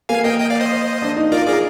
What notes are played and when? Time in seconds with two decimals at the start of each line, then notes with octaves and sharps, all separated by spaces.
0.09 A#3 F5 G#5
0.24 A#3 D#5 G5
0.40 D#5 G5
0.50 D5 F5
0.61 C5 D#5
1.02 D4
1.16 D#4
1.32 F4 A#4 D5
1.47 G#4 A#4 D5